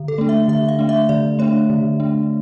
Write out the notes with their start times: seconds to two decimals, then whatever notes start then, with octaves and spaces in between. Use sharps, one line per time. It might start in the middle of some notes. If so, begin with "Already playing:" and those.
Already playing: D3
0.08 A4
0.18 A3 D4
0.29 E5
0.48 D3 E5
0.69 F5
0.79 A3 D4
0.89 E5
1.09 D3 D5
1.39 A3 D4 C#5
1.70 D3
2.00 A3 D4